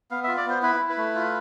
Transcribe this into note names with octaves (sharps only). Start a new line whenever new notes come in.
B3 F5
F4 E5
D5
B3 C5
E4 B4
E4
B4
A3
F4